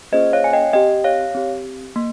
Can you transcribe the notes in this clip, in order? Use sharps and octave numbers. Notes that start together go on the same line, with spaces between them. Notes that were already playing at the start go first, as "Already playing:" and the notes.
A#3 C#4 F4 G#4 C5 D#5
C#5 F5
G#5
D#5 G5
C4 G4 D#5 G5
C#5 F5
C4 G4
A#3